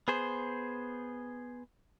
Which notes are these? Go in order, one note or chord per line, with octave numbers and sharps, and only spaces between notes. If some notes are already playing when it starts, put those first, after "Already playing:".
B3 G#4 C5